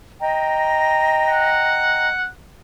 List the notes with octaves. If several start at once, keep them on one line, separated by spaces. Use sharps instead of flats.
D#5 G5 A#5
F#5